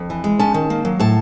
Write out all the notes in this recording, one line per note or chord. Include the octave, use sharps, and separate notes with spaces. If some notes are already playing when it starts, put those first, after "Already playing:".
Already playing: F2
E3
G#3
C#4 A5
D#3
A#3
F#3
A2 A5